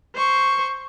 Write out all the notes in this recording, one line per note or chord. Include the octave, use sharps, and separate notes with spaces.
C5 C#6